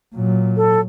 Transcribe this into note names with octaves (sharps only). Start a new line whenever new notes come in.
A#2 F#3
A4